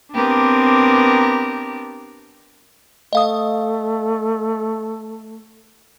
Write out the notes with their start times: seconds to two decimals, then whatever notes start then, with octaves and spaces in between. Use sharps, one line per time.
0.14 B3 C4 D4 G4 A#4
3.13 A3 D#5 F5 D#6